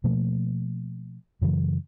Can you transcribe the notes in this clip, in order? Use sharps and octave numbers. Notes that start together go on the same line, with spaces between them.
B2 F3 A3 A#3
F#2 C#3 E3 F#3